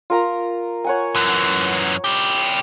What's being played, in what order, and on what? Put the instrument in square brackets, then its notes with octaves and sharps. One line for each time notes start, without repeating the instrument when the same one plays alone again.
[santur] F4 A#4 A#5
C#5 F#5 G#5
[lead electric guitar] F#2 E3
E4 G4